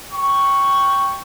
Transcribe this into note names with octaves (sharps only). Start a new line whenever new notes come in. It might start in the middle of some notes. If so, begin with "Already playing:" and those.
G5 C#6